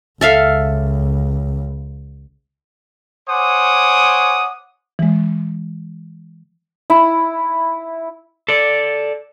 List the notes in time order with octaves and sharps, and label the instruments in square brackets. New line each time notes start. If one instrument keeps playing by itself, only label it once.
[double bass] C#2 [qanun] A4 E5 F5
[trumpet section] C5 C#5 F#5 G#5 D6 D#6
[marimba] E3 G#3
[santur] E4
[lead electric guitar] A4 D5